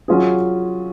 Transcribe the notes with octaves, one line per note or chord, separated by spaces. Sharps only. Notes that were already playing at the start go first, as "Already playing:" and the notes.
F#3 C#4 F4 G#4